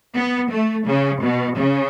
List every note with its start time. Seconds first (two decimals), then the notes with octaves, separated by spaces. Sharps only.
0.15 B3
0.50 A3
0.87 C#3
1.23 B2
1.57 C#3